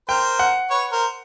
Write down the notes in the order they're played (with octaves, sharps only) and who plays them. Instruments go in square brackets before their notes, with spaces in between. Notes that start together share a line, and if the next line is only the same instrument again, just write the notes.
[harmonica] A#4 C5 [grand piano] G5
[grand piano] F#5
[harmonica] B4 C#5
A#4 C5